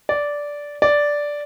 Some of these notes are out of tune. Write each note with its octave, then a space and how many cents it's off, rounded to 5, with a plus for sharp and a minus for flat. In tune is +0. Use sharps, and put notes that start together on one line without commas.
D5 -10
D5 -5